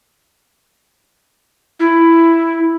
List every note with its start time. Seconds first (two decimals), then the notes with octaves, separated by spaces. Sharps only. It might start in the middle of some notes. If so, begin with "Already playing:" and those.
1.80 E4